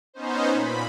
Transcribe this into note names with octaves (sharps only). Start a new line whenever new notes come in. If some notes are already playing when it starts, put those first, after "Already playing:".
B3 C#4 D#4 C5
A#2 B5